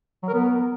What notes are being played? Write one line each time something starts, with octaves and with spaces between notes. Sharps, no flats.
F#3
A#4
B3